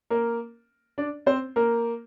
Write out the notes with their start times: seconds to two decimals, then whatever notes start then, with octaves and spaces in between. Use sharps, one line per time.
0.10 A#3 A#4
0.98 D4 D5
1.26 C4 C5
1.56 A#3 A#4